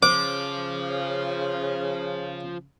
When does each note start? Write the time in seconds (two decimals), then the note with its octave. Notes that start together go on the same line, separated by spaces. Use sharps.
0.03 C#3 F3 C5 D6